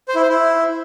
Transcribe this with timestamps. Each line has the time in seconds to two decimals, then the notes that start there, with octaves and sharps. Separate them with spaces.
0.08 C5
0.15 E4
0.22 C5
0.29 E4